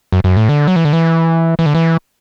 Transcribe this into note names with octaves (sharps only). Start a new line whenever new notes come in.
F#2
F#2
A2
D3
F#3
E3
D3
E3
E3
D3
E3